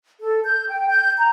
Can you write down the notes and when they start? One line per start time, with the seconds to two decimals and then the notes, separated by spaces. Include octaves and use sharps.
0.20 A4
0.44 G6
0.69 G5
0.89 G6
1.18 A#5